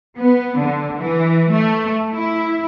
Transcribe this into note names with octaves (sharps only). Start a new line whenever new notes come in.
B3
D3
E3
A3
E4